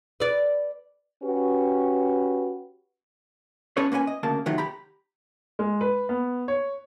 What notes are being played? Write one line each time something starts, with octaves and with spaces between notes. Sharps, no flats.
B4 D5
C#4 F#4 G4 B4
C#4 G#4 A4 B4 C#5
A#3 C#4 B4 F5 G#5
D#5
D2 C#3 A#3 A5
F2 C3 D#3 E3 F#3 A3
G4 A#5 B5
G#3
B4
B3
C#5